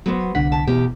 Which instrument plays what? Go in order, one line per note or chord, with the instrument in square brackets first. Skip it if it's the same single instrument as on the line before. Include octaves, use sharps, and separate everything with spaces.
[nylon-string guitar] F#3 B3 C5
[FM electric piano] C2 D3 B6 [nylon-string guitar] F#5
[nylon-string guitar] A5
[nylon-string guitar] E2 G4 [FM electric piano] B2